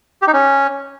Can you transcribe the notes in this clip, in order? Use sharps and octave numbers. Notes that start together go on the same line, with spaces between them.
G4
D#4
C#4